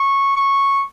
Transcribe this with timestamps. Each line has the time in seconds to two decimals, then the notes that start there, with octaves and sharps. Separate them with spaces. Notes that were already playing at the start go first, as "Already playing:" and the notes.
Already playing: C#6
0.36 C#6